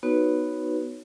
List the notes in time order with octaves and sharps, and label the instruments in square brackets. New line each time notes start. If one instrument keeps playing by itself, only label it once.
[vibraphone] B3 D#4 F#4 B4 C#5